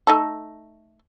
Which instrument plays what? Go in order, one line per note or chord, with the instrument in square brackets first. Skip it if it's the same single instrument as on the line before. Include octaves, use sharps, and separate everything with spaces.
[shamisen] A3 D#4 A4